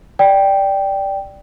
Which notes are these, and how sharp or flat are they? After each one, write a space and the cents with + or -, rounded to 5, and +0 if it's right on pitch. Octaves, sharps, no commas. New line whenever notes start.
D5 +0 G5 +0